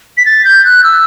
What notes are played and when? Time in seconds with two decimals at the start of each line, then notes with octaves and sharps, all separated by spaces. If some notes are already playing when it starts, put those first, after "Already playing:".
0.17 B6
0.26 A6
0.44 G6
0.65 F#6
0.84 E6